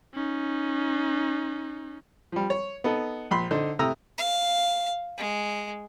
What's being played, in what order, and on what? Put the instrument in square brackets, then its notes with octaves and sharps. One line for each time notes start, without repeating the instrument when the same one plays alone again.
[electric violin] C#4 D#4
[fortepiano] F3 G3
C#5
B3 D#4 A4
A#1 B5 C6
D3 D#4 C5
C3 A3 E4 A#5 D#6 E6
[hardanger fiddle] F5
G#3